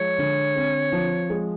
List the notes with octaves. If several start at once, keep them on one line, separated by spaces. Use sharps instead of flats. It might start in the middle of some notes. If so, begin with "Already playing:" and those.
Already playing: F3 G#3 C#5
D3
C4
F3
G#3